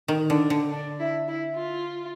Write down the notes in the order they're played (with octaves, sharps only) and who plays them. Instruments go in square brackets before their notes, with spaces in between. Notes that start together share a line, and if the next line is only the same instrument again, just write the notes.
[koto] D#3
[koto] D3 [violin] D4
[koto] D3
[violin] D4
E4
E4
F4